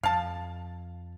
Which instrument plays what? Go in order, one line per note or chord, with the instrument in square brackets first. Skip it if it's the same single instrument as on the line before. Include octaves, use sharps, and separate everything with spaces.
[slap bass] F2 [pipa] F5 A5